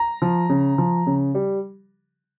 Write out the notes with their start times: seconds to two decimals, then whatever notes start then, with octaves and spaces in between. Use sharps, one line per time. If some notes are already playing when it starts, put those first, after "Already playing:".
Already playing: A#5
0.22 F3
0.50 C#3
0.78 F3
1.07 C#3
1.35 G3